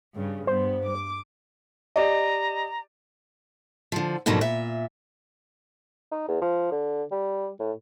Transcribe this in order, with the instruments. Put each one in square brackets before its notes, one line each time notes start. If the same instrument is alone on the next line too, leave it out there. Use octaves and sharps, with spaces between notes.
[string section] G2 C#3
[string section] G2 B3 [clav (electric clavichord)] C5
[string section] D6
[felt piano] G4 D5 D#5 [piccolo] A#5
[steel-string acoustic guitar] D3 F3
G#2 B2 D3 F3 F#3 A#3
A#2 E5
[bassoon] D#4
E2
F3
D3
G3
A2